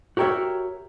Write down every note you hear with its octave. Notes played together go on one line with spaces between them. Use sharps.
F#4 G4 A#4 C#5 E5